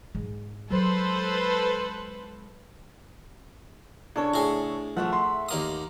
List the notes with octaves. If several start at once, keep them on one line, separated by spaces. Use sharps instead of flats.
G#2 G#3
F#3 G#3 A4 B4 C5
C#3 D4 A4 C#5
A2 G#4
F3 A3 E5 F#5
C6
D#2 A#3 D#6